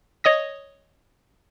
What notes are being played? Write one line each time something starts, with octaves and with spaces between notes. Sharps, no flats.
C#5 D#5 D#6 A#6